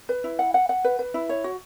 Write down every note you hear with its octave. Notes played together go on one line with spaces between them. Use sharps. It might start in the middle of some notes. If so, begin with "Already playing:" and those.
B4
E4
F#5
F#5
F#5
B4
B4
E4
C#5
F#4